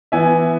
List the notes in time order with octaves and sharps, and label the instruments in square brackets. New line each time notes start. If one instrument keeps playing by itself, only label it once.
[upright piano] E3 B3 E5 G#5